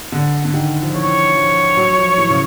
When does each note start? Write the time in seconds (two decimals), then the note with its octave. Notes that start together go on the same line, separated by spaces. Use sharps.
0.12 D3
0.45 D3
0.54 D#3
0.83 F3
0.95 E3 C#5
1.36 F3
1.77 F#3
1.98 F3
2.18 E3
2.30 C#3